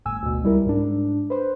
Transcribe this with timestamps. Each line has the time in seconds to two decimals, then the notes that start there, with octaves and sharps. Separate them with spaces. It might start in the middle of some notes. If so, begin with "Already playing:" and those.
0.05 G1 A2 G#5 E6
0.23 D2 B2
0.43 C2 G3 E4 A#4
0.66 G#2 D4
1.30 B4 C5